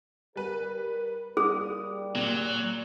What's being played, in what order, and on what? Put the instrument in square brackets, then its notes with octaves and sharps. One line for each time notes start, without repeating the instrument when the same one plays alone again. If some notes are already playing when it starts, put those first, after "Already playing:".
[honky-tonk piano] G3 B4 [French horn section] A#4
[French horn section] G3 A#3 G4 [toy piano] G#4 [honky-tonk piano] D#6
[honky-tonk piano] A#2 [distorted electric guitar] F#3